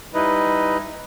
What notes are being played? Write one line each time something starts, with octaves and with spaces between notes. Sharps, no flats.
G3 D#4 E4 B4 D#5